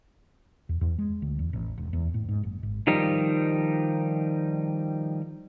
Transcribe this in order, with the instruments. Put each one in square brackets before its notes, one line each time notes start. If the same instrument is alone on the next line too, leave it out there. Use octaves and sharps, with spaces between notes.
[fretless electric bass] E2
E2
G#3
D2
E2
A1
E1
E2
A2
G#2
F#1
G#1
[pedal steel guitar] D#3 F3 G3 D#4